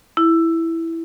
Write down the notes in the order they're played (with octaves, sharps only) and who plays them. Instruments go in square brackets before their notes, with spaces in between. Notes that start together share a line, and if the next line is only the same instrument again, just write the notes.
[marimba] E4